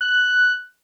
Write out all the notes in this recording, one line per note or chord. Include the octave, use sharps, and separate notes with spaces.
F#6